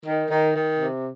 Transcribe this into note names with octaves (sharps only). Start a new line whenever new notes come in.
D#3
D#3
D#3
C3